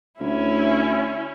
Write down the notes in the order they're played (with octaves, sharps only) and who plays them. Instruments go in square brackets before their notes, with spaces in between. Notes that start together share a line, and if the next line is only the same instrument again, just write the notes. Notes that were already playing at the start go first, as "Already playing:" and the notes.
[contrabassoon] D2 [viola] C#4 E4